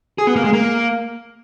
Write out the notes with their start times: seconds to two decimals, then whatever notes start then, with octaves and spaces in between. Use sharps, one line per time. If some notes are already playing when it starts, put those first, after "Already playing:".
0.18 G#4
0.27 B3
0.36 A#3
0.44 G#3
0.53 A#3